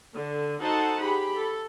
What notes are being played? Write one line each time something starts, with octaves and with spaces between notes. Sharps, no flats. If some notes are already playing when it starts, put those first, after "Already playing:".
D3
D#4 F#4 A4 C5 F#5 A5
G4 G#4 B5
A4